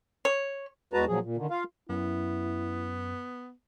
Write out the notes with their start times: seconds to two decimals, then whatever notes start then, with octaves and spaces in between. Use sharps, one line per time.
0.25 C#5
0.93 E2 G#3 F#4 B4 A5 A#5
1.08 A#2 F3 F#3 G#4
1.23 A#2
1.37 D3 D#3
1.50 F4 F5
1.89 F#2 B3 E4